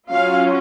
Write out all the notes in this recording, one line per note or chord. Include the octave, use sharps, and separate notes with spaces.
F#3 C#4 F4 F5